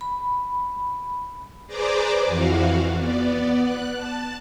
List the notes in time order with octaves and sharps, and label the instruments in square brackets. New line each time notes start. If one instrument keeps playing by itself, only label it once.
[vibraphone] B5
[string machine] G#4 B4 C5 D5 A#5 D6
F2 E3 F#4 F5
B3 D5
F#6
A5